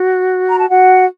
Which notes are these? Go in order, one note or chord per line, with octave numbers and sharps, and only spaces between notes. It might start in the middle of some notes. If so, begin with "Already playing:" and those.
Already playing: F#4
A#5
A5
F#4 F#5